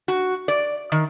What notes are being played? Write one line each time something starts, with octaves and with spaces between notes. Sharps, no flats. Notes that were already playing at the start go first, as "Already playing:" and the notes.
F#4
D5
D#3